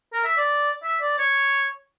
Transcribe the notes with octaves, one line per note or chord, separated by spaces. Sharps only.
A#4
E5
D5
E5
D5
C#5